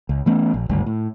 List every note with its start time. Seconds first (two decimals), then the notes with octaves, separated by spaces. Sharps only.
0.09 C#2
0.26 E3 A3 B3 C#4
0.54 A#1
0.69 G#1 D2 G2
0.86 A2